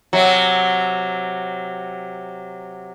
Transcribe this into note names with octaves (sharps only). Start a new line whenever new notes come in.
C3 F#3